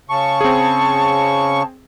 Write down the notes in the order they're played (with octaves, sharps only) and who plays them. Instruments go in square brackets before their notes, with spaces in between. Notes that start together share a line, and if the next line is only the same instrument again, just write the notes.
[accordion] C#3 C#6 [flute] A5
[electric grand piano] C4 G#4